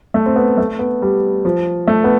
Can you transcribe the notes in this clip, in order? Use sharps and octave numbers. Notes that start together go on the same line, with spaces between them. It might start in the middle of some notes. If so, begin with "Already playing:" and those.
A3
C4
B3
A3
B3
G3
F3
A3
B3